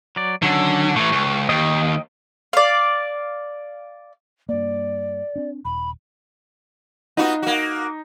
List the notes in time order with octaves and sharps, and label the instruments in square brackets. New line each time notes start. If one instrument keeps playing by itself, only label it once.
[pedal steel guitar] F#3 D5
[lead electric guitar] D3 [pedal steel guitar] D#3 F#3 C#4
[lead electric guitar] A2 E3 [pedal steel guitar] C#6
[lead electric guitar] C#2
[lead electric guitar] D#2 [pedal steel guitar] D#5 G5
[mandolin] D5 F5
[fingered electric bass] G2 A#3 [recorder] D5
[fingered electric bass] C4 D4
[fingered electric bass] D#1 [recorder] B5
[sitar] B3 F4 F#4 [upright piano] D#4
[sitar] A#3 F#4